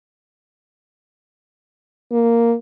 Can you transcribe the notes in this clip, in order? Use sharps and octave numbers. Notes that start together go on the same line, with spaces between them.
A#3